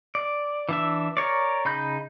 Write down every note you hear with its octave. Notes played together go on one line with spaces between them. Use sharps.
D5
E3 D4 E5
A#4 C#5 D5
C#3 D#4 B5 G6